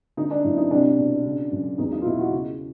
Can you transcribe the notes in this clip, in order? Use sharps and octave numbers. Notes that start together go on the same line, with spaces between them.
D3 D#4
D4
F#2 E4
D#4
C2 D4
B2
C#3
F#2
E2 D#4
D#4
F4
B2 E4
F#4
C#3